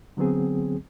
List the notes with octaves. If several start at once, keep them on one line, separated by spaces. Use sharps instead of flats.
D3 F#3 B3 C4 G#4